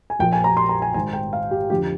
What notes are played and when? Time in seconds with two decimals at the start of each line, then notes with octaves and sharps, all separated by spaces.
0.10 G#5
0.19 A#1 A#2 F3 G5
0.32 G#5
0.44 A#5
0.57 C6
0.69 A#5
0.82 G#5
0.94 G#1 G#2 D#3 G#5
1.13 G5
1.33 F5
1.51 G4
1.70 F2 D3 G4